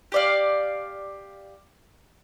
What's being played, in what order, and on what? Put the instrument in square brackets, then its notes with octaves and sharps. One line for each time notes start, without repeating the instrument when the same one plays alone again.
[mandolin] G4 D5 F5